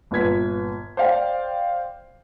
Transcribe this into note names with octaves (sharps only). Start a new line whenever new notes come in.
G1 A#2 B4 G#6 B6
C5 D5 F5 G5